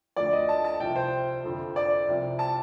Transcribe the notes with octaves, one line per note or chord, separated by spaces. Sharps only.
D2 D3 F3 D5
D#5
A5
A5
C2 C3 F3 G5
C5
F2 D3 F3
D5
C2 C3 F3
A5